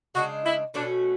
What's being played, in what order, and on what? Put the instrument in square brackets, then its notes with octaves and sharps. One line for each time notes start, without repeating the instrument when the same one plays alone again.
[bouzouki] C#3 G#3 D4 [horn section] F#4
[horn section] E4
[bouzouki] B2 A3 C#4 F#4 [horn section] D4